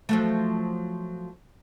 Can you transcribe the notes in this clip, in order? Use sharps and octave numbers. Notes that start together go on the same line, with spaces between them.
F3 F#3 A3